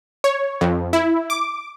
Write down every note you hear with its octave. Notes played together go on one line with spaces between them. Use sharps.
C#5
F2
E4
D6